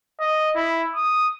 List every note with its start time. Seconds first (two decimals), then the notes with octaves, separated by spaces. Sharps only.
0.20 D#5
0.56 E4
0.95 D#6